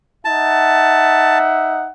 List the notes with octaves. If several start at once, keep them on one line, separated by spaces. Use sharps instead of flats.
D#4 E5 F#5 A5